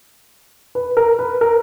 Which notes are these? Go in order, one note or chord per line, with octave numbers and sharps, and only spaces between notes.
B4
A#4
B4
A#4